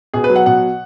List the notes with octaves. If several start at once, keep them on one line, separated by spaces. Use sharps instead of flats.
B2 G#4
B4
F#3
F#5
B2 F#5